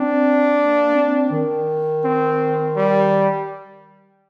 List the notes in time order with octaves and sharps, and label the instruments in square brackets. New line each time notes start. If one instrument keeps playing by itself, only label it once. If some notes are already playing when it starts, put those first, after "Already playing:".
Already playing: [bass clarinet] C4 [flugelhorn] D4
[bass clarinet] A#3
C4
D#3
[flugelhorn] C4
G3